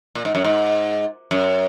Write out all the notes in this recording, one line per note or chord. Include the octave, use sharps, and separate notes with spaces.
A#2
G#2
F#2
G#2
F#2